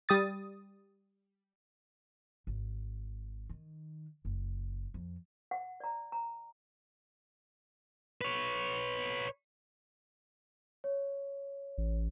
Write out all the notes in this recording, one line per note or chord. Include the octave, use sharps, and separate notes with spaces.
G3 D#6 A6
G#1
D#3
F#1
F2
F#5
D5 A#5
A#5
B4 C#5
C#5
A1